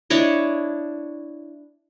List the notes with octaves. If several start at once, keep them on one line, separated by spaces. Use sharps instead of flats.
D4 E4 C#5 D#5